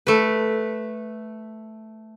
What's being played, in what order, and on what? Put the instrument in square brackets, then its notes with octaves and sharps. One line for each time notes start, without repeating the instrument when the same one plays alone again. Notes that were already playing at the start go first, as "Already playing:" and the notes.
[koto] A3 B4